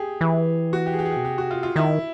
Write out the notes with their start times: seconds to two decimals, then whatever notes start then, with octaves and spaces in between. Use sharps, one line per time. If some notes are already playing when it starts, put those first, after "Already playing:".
Already playing: G4 G#4
0.21 E3
0.73 F#4
0.86 G4
0.93 G#4
0.99 G4
1.05 G#4
1.11 G4
1.17 B2
1.24 C3 G4
1.38 F#4
1.51 F4
1.63 F4
1.76 D#3 E4